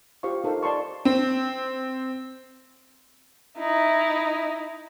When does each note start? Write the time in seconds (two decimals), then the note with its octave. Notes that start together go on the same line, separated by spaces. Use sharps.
0.23 F4 G4 C5 F5 C#6
0.44 D#4 A4 A#4 C5 F5
0.63 D5 A5 C6 C#6
1.05 C4
3.58 D#4 E4